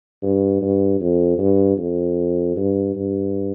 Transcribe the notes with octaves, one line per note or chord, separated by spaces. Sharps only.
G2
G2
F2
G2
F2
G2
G2